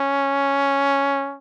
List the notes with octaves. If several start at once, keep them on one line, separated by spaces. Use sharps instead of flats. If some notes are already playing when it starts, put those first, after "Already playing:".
Already playing: C#4